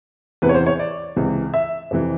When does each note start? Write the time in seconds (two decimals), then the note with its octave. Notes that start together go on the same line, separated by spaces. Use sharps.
0.42 E2 C3 E3 B4
0.49 C#5
0.54 C5
0.66 C#5
0.79 D5
1.16 C#2 C3 E3
1.54 E5
1.91 F2 C3 E3